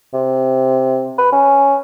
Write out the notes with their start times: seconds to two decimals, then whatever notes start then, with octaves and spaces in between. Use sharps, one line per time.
0.14 C3
1.18 B4
1.33 C#4